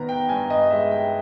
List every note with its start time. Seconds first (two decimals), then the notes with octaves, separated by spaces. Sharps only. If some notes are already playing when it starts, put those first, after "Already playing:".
Already playing: D#3 B3 A#5
0.09 G5
0.29 G2 G#5
0.50 D#5
0.70 G#3 E5
0.91 G5